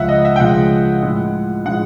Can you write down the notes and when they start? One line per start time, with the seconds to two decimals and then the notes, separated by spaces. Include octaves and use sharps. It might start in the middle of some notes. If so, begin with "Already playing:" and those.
Already playing: C#2 C#3 F3 G#3 E5 F#5
0.08 D#5
0.25 E5
0.36 G5
0.40 C#2 C#3 F3 G#3 F#5
1.03 A2 F3 G#3
1.66 A2 F3 G#3 F#5